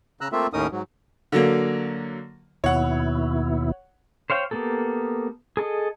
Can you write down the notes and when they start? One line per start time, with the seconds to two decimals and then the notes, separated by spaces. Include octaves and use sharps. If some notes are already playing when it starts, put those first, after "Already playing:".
0.21 C#3 A#5 E6 F#6
0.32 A3 A#3 C4 F4 E5
0.53 D#2 A2 C#4 D#4 A#4 D#6
0.71 G#2 F#3
1.32 D3 F#3 A#3
2.64 D#2 B2 E4 C#5 F#5
4.30 C5 C#5 F5 G5
4.51 A#3 B3 G4 A4
5.57 G#4 A4 D#5